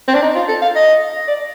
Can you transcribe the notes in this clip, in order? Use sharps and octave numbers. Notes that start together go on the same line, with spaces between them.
C4
D4
D#4
F4
A4
F5
D#5
D5